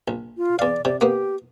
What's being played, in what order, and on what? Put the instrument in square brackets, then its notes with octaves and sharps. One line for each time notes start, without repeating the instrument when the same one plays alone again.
[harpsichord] A#1
[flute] F4
[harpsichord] E2 F5 [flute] D5
[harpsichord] C3 [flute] D5
[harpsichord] A#3 B3 [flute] G4